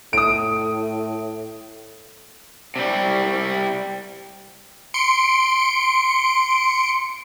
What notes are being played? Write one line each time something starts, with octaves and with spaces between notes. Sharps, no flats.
A2 D#6 D7
C3 G3
C6 C#7 D7